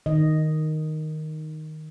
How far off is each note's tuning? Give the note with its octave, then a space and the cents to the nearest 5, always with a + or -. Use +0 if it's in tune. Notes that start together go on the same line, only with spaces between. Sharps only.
D#3 +0 D#5 +0